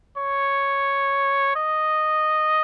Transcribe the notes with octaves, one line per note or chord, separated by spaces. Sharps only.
C#5
D#5